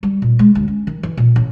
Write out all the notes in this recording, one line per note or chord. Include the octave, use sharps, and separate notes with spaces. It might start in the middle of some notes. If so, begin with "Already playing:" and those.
G3
A#2
G#3
D2
C#4
D#3
E3
A#2
A1